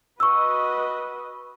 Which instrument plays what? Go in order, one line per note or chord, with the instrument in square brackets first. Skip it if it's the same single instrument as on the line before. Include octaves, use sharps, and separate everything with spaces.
[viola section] F#4 B4 D#5 [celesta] C#6 E6